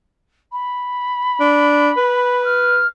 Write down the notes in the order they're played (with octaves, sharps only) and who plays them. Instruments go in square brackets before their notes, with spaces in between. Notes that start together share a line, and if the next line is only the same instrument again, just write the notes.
[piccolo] B5
[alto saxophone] D4
B4
[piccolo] F6